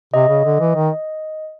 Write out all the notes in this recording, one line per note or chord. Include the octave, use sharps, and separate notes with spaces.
C3 D#5
C#3
D3
E3
D#3